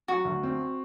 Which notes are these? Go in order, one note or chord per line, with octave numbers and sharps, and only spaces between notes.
F#3 F#4
D2
C4